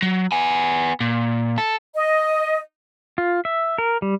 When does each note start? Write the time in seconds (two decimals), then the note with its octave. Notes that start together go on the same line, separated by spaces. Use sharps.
0.02 F#3
0.32 B3 G#5
1.01 A#2
1.58 A4
1.95 D#5
3.18 F4
3.45 E5
3.78 A#4
4.02 G3